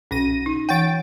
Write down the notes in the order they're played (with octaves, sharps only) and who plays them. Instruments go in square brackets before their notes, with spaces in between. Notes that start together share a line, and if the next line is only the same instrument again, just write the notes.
[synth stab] B1 A#6 D#7 [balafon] C#4
[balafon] D#4
[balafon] E3 F#5 [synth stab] G5 A6 D7